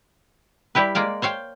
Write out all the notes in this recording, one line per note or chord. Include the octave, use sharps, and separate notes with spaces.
G3 E4 G4 B4
G#3 A#3 D5 F5
C5 C#5 F5 G5